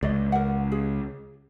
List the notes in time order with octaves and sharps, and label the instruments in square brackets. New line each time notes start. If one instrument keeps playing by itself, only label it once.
[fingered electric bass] C#2 [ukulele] D5 D#5
[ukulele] A#4 F#5
G#4